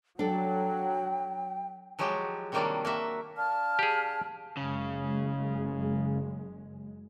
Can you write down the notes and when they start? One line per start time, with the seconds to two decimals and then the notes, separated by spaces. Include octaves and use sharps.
0.19 F#3 D4 A4 G5
1.99 F3 F#3 G#3 F#4 G4
2.52 C3 D#3 F#3 G3 A#3 D4
2.85 A#3 F#4 E5
3.37 D4 F5 A5 F6
3.79 G4 G#4
4.57 F#1 C#3 G#3